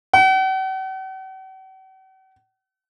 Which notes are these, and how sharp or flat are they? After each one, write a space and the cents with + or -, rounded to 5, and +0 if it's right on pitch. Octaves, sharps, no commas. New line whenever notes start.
F#5 +45